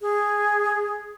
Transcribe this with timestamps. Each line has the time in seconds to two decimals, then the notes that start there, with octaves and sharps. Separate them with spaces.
0.01 G#4